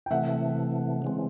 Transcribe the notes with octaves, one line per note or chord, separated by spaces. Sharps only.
G5
C3 E3 A3 E5 F#5
C#3 E3 G#3 C4